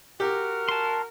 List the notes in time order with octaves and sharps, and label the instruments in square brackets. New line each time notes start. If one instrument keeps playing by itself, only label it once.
[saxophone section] F#4 A#4 [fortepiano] G4
[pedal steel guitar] A5 C6